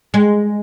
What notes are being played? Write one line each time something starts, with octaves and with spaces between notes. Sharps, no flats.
G#3